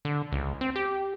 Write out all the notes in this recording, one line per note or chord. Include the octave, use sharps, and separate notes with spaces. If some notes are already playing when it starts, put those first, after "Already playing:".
D3
C#2
C4
G4